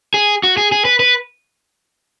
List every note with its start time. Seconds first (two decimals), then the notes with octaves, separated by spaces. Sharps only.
0.14 G#4
0.43 F#4
0.57 G#4
0.72 G#4
0.85 B4
1.00 B4